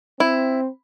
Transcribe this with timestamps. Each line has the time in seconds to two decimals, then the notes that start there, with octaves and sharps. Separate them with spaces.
0.20 C4 E4